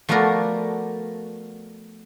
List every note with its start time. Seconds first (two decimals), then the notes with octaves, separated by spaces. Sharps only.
0.09 F3 A3 B3 F#4 A#4 D5